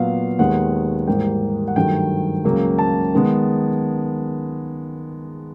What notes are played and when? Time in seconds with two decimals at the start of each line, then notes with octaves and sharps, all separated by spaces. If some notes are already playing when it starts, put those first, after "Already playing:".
Already playing: A#2 F#3 B3 F5
0.39 D#2 D#3 G#3 B3 F#5
1.07 G#2 E3 G3 A#3 G5
1.68 F#5
1.76 G2 D#3 F#3 A3 G5
2.44 C#2 C#3 F#3 A#3
2.79 A5
3.15 D#3 G#3 B3